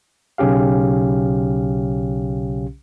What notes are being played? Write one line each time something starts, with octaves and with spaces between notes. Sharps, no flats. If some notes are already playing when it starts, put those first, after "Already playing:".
B1 C#3 C#4 G4 F5